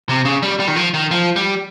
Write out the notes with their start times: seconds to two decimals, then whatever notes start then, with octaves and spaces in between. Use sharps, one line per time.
0.09 C3
0.25 C#3
0.43 G3
0.60 G3
0.68 D#3
0.76 F3
0.94 D#3
1.11 F3
1.36 G3